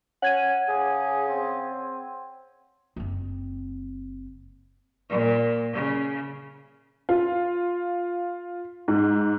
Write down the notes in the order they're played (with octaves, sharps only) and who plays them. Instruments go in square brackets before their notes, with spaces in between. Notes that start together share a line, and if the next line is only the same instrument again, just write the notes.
[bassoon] C#4 [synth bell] F#5 G#6 D#7
[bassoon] C#3 [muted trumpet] G#4
[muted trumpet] C4
[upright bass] F#1 C4
[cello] A#2
C#3
[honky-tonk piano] F4
G#2